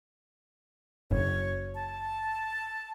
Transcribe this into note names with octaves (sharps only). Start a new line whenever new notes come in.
F#1 C#5
A5